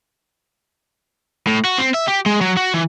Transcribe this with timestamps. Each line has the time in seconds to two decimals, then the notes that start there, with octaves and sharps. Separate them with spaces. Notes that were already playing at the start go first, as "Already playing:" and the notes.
1.47 A2
1.65 F#4
1.78 C4
1.94 E5
2.08 G4
2.26 G#3
2.41 F#3
2.57 F#4
2.74 E3